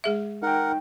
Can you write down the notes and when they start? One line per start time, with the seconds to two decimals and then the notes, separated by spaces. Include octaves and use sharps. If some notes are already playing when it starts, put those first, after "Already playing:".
0.04 G#3 G#4 E5
0.42 D#4 A#4 F#5 G5